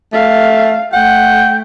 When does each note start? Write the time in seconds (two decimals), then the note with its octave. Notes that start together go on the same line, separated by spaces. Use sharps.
0.13 A3 F5
0.93 A3 F#5 G5